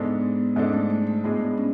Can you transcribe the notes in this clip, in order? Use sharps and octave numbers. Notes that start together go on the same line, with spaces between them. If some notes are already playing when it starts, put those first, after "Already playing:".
Already playing: G#2 G#3 B3 D4 A4
G#2 G#3 C#4 D4 A4
A3
A3
A3
A2 G#3 B3 D4 G#4
C#4